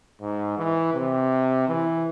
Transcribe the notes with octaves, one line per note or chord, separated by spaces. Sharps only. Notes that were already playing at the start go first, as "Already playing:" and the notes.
G#2
E3
C3
E3